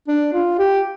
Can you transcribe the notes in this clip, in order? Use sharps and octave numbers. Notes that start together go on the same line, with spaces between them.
D4
F4
G4